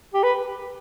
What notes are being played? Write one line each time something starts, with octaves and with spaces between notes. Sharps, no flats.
G4
B4